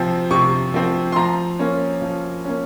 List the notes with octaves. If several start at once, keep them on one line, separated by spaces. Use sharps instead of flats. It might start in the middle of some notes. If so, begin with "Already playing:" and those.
Already playing: C3 F3 C4
C3 C#6
F3 C4
C6
F3 A#5
A#3 C#4
F3
A#3 C#4